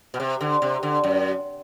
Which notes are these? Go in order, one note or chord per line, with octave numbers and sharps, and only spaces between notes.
B2
C3
D3
C3
D3
F#2